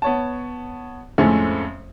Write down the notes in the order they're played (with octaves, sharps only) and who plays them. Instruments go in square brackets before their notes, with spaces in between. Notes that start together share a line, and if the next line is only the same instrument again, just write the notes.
[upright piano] B3 C#5 A5
F2 A2 G#3 A3 C4 C#4